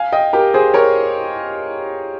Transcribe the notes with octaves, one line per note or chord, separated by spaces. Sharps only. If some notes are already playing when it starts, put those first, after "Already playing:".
Already playing: F5 G#5
D#5 G5
G4 A#4
G#4 C5
A#4 C#5